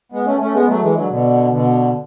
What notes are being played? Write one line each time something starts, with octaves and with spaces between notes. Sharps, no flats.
G#3 B3
A3 C#4
A3 C#4
G#3 B3
F#3 A3
E3 G#3
D3 F#3
B2 D3
B2 D3